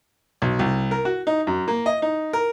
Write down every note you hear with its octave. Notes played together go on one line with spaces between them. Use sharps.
B1
C2
A#4
F#4
D#4
F#2
A#3
D#5
D#4
A#4